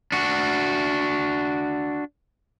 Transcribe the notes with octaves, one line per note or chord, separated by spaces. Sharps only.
D4 F#4